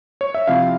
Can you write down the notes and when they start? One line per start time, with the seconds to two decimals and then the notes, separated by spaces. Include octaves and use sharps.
0.21 C#5
0.34 E5
0.47 C3 F3 C4 E4 F5